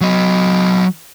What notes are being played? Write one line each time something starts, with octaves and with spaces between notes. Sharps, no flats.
F#3 D#5